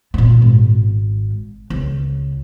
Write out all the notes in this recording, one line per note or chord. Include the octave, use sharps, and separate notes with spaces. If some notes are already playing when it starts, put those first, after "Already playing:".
A#2 B3
G#1
C#2